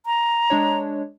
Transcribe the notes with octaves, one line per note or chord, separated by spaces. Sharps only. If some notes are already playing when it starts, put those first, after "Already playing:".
A#5
G#3 D4 C#5